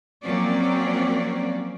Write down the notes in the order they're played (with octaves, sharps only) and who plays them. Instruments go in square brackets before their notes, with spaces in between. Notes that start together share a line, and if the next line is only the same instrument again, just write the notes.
[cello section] F3 F#3 A#3 C4 C#4 D5